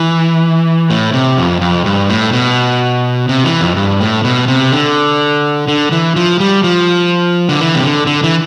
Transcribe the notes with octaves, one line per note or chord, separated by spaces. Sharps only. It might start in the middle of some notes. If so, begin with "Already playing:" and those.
Already playing: E3
A2
C3
F2
F2
G2
A2
B2
C3
E3
F2
G2
A2
B2
C3
D3
D3
E3
F3
G3
F3
D3
E3
C3
D3
D3
E3